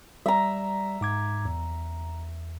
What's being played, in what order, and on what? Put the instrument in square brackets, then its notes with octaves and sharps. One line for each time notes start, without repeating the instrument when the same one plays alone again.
[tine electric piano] G3 D5 [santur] E5 A#5
[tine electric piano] G#2 D6 G#6
E2